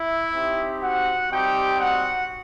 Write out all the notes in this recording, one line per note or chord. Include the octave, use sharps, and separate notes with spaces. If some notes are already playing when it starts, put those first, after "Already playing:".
Already playing: E4 E5
C4 D#4 G4
F#4 F#5
G3 C4 D#4 G4 G5
F#4 F#5